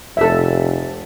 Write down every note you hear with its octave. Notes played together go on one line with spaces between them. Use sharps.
F1 A4 E5